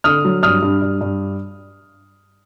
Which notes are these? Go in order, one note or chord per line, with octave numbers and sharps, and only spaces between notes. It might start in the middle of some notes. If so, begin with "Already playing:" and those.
D3 D#6 F6
F#3
G2 D#6 F6
G2
G2
G2